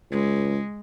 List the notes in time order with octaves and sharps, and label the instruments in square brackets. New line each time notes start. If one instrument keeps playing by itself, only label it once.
[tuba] C#2 [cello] G#3